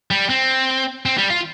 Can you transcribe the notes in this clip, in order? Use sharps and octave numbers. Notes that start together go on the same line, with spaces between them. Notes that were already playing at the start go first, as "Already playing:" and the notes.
G3
C4
C4
G3
F4